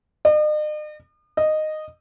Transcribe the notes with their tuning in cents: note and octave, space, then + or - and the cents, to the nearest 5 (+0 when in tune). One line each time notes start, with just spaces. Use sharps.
D#5 -45
D#5 -10